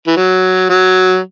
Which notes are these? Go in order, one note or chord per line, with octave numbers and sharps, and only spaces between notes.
E3
F#3
F#3